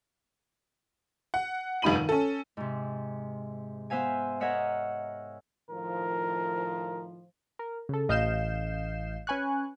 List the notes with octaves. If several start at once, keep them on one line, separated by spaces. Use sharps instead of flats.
F#5
F1 G2 D#4 B5 D#7 F#7
D#3
C#4 A4
G#2 C3
B3 C5 E5 F5 G#5
A#4 C#5 D#5 E5 F#5 F6
A2 D#3 F3 A#4
A#4
C#3 A4
A1 D#5 F5 G6 C7 E7
C#4 B4 G#5 C#6 F#6